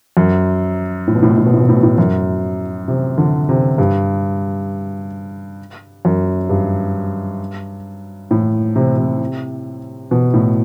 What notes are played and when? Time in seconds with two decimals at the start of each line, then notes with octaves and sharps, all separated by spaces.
0.17 F#2
1.08 A2
1.15 B2
1.23 A2
1.30 B2
1.37 A2
1.45 B2
1.54 A2
1.60 B2
1.69 A2
1.76 B2
1.83 A2
1.98 F#2
2.88 C3
3.18 D3
3.49 C3
3.78 G2
6.05 F#2
6.49 G2
8.31 A2
8.76 C3
8.97 C3
10.11 B2
10.34 A2